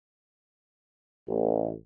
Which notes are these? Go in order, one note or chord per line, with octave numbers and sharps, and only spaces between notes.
A1